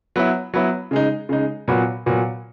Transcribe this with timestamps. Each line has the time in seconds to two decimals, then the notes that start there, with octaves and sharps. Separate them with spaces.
0.16 F#3 B3 E4
0.54 F#3 B3 E4
0.91 C#3 G#3 D#4
1.29 C#3 G#3 D#4
1.68 A#2 F#3 B3 F#4
2.06 A#2 F#3 B3 F#4